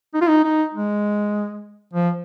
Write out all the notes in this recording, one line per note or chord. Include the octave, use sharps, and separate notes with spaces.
D#4
F4
D#4
D#4
G#3
F3